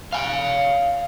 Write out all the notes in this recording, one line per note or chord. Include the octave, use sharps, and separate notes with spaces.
F5 G#5